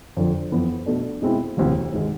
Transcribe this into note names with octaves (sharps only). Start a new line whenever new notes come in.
F2 D3 F3
F2 E3 B3
B2 A3 D4
B2 G#3 C4 E4
E1 D2 C3
G#1 G#3